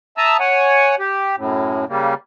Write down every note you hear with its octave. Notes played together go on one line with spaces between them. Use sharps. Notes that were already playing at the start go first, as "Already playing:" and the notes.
E5 A5 A#5 D#6 E6
C#5 F#5 G#5
G4
F#2 A2
C#3 G3 A#3